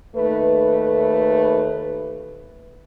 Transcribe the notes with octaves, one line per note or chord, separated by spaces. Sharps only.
D#2 A3 B4